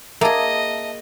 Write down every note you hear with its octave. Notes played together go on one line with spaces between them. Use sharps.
A#3 G#4 D#5 E5 A5